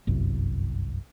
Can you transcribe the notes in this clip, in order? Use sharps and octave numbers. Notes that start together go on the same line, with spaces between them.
G1 C2 F#2